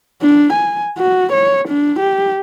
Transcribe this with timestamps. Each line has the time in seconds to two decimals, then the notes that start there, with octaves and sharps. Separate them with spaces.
0.22 D4
0.53 G#5
0.98 F#4
1.32 C#5
1.68 D4
1.99 G4